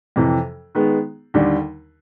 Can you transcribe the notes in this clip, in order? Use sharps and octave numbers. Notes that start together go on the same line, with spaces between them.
F2 C3 E3
D#3 G#3 B3
D#2 D3 G3